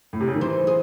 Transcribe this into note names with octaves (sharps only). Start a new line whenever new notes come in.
A2
C3
C#3
D#3
E3 C5
G#4